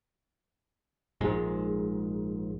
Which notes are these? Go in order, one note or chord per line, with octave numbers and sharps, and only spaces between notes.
A#1 G#2 G#3